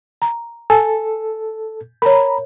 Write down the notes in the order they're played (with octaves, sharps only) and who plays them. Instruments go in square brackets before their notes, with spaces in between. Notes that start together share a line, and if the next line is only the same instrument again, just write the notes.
[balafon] A#5
[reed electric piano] A4 [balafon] G#5
[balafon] A#4 C#5 [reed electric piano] A#5 B5